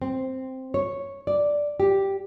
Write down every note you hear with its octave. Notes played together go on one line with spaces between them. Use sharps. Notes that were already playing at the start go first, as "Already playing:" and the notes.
C4
C#5
D5
G4